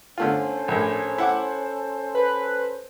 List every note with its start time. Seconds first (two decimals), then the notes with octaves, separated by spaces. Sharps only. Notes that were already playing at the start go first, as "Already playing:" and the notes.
0.18 D3 A3 C#4 F4 A4 C5
0.68 A#1 A2
1.18 E4 F#5 D6
2.15 B4